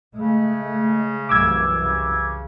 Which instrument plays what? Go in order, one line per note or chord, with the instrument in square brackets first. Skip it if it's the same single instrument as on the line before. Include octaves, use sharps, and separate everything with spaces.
[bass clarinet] C#3 [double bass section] G#3 A3
[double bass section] C2 F#2 E3 [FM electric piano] D6 E6 G#6
[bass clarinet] C#3